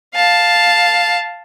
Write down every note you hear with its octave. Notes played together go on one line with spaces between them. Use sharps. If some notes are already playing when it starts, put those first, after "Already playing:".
F5 A5